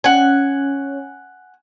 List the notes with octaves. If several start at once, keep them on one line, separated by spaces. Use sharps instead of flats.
C#4 F#5 G#5